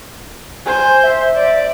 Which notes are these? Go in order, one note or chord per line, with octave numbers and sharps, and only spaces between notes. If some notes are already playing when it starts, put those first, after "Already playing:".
C5 G#5
E5
D5